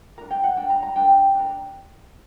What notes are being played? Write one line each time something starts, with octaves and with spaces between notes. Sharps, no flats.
D4 A#4 A#5
G5
F#5
D4 A#4 G5
A#5
A#5
D4 A#4 G5
D4 A#4